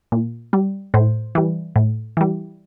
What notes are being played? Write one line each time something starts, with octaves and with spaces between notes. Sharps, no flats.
A#2
G3
A2 C5
E3 G3
A2
E3 G3